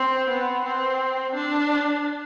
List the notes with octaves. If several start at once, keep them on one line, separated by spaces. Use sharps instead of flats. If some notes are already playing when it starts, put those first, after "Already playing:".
Already playing: C4
B3
C4
D4